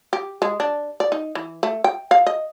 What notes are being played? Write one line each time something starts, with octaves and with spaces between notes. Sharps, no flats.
G4
G#3
D4
D5
D#4
E3
A3
G5
F5
D#5